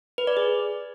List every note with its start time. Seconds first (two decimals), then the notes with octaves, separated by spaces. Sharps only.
0.18 B4
0.27 D5
0.37 G#4